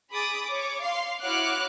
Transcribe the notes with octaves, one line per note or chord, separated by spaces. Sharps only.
G#4 B5 D6 D#6 A6
C#5 D6
F5 C6
E4 F#4 C#5 D6 F6 F#6